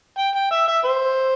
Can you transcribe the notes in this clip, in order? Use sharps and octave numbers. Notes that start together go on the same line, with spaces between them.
G5
G5
E5
E5
C5